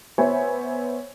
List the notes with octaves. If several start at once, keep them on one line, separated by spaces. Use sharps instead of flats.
B3 C5 C#5 E5 G#5